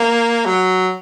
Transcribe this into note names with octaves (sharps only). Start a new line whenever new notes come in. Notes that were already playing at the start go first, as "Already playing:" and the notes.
Already playing: A#3
F#3